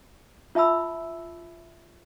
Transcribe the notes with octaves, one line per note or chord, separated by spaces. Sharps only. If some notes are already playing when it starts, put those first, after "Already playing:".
F4 E5 A5 B5 E6